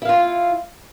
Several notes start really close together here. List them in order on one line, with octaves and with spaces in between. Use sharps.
E4 F5 F4